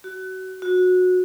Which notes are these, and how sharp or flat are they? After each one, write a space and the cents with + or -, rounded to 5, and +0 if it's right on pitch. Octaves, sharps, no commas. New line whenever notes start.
F#4 +25
F#4 -20